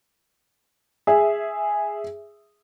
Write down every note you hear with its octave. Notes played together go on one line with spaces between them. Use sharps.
G#4 E5